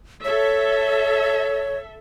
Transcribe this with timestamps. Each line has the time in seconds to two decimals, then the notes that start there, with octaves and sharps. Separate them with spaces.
0.24 A4 C#5 E5